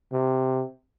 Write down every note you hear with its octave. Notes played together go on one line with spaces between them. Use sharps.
C3